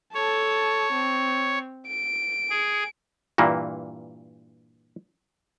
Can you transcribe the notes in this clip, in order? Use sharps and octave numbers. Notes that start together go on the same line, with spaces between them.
A4 C#5 A5
C4
D7
G#4
G2 A#2 E3 A#3